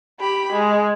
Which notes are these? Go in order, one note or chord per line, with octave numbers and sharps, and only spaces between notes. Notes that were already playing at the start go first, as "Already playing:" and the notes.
G4 B5
G#3